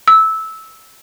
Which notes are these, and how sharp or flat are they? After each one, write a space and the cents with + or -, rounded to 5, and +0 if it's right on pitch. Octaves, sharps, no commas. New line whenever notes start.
E6 -15